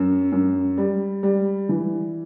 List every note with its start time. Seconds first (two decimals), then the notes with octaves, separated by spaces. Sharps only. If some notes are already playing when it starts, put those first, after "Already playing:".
Already playing: F#2
0.32 F#2
0.78 G3
1.23 G3
1.69 E3